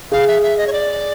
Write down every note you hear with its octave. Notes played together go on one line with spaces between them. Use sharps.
G#4 F5
E5
E5
D#5
C#5
D5